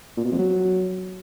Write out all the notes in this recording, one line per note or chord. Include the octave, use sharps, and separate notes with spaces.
A#2
B2
F2
F#3